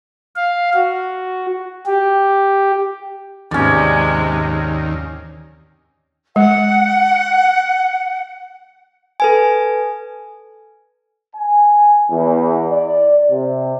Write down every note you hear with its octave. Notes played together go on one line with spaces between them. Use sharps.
F5
F#4
G4
D#2 G#2 C3 G#3 C#4 D5
G#3 F#5
A4 B4 G#5
G#5
E2
D5
C3